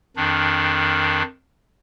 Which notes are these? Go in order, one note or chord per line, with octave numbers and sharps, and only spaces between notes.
F2 D#3 D4